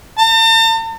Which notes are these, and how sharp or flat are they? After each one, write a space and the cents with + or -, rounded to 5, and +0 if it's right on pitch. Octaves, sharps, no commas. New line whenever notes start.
A5 +45